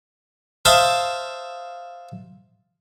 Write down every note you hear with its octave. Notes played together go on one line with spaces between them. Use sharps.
C5 E5 F5 A5 D#6